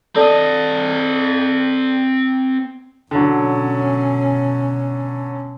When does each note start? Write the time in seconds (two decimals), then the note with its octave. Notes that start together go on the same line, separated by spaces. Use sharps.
0.16 C4 A4 D5 D#5 A5
3.11 B2 D3 F#3 C#4